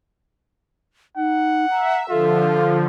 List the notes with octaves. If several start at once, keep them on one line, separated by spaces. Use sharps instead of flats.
D#4 F#5
E5 A#5
D3 F3 F4 A4